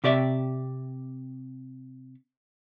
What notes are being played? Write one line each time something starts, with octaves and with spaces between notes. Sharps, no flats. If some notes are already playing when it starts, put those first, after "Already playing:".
C3 G4 D5 E5